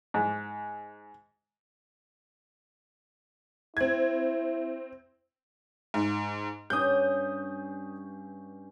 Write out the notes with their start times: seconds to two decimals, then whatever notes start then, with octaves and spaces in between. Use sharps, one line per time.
0.14 G#2
3.77 C4 E4 G#6
5.94 G#2
6.70 G2 C#4 D6 D#6 G6